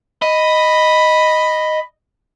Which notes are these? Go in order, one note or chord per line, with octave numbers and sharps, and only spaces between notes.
D#5 B5